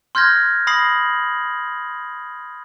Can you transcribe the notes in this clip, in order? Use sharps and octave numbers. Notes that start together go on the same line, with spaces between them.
C6 F6 G6 G#6 A#6
B5 D#6 A#6 C7 F#7